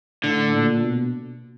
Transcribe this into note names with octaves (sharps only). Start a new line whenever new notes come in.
A2 D3
A#2
B2